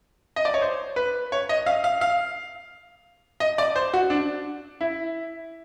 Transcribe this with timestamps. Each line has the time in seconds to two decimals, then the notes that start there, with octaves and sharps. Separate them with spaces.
0.36 D#5
0.45 D5
0.54 C#5
0.62 C5
0.96 B4
1.32 C#5
1.49 D#5
1.66 F5
1.84 F5
2.01 F5
3.40 D#5
3.58 D5
3.76 C5
3.94 F#4
4.10 D4
4.81 E4